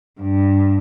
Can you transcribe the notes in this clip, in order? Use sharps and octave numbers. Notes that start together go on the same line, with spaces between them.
G2